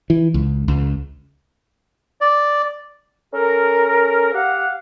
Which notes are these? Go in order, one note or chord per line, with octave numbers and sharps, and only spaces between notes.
E3
C#2
C#2
D5
C#4 A4 A#4
G4 F5 F#5